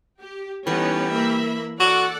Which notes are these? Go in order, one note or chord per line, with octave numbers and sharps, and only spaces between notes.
G4
E3 G3 A3 B3 C#4 D#4
A#3 E5 B5
F#4 A4 D5 F#5